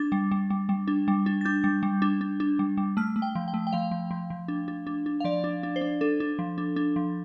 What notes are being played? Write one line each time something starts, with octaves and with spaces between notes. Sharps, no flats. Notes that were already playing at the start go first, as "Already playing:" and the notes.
Already playing: D4 A6
G3
G3
G3
G3
D4
G3
D4
A6
D4 G6
G3
G3
D4
D4
D4
G3
G3
A3 F6
A3
G5
F3
G5
A3
G5
F3 F5
F3
F3
F3
D4
D4
D4
D4
F5
F3 D5
D4
D4
C5
D4
D4 A4
D4
F3
D4
D4
F3